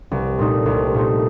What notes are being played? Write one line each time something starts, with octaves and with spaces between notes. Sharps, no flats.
C2
A#2 A3 D#4
C2
A#2 A3 D#4